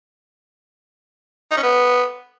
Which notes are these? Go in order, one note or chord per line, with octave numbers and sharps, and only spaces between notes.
D#4
C#4
B3